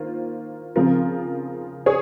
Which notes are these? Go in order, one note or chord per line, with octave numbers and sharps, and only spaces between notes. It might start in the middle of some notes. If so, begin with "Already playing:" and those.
Already playing: D#3 A#3 F4 C5
C#3 F3 C4 F4 A#4
G#4 C#5